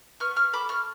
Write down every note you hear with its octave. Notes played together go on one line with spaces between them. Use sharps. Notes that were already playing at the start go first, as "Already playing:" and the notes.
B3 C#6 F6
C#6 F6
A4 B5 D6
C#6 F6